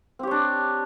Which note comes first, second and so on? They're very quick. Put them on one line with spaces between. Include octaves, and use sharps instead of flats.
C4 G4 C#5 D4